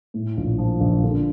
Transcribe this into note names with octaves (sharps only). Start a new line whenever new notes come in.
A2
A#1
F3
A#1
D3